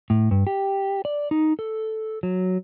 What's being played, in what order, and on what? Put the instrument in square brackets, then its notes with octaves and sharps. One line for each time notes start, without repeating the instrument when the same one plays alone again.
[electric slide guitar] A2
G2
G4
D5
D#4
A4
F#3